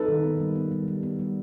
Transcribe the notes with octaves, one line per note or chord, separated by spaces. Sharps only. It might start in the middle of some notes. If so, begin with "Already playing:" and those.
Already playing: D#4 A4 B4
D#3
B3
G3
B3
G3
G3
B3
G3